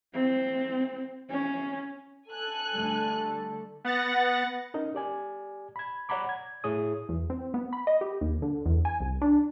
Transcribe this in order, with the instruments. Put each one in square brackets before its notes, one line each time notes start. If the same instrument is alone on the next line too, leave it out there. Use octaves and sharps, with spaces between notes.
[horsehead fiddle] C4
C#4
[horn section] A4 [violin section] G#5 F#6
[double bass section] D3 G3 A3
[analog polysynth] B3 F#5 A6 A#6
[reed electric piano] C#4 D#4 A#4
G4 D5 G#5
B5 G#6
C#5 D5 F#5 A#5 B5 D6
G#6
A2 E4 G#4 C#5 D#6
[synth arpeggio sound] E2
C4
B3
B5
D#5
G4
D#2
D3
E2
G#5
C2
D4